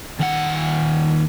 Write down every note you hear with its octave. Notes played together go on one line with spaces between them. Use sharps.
D#2 F#5